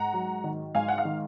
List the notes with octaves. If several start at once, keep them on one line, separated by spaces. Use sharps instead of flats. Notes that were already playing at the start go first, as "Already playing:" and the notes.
Already playing: G#2 F#5 A#5
F#3
D#3
G#2 F5 G#5
F#5
F5
D#3